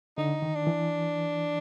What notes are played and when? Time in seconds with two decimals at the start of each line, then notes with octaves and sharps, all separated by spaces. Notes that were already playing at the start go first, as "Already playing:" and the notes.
0.17 D3 D#4
0.42 D#3
0.55 D4
0.67 E3